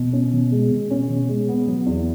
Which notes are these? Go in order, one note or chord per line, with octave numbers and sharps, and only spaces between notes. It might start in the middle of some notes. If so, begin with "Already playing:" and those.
Already playing: B2
C#4
B2
G#3
B2
C#4
B2
G#3
B3
F#3
E2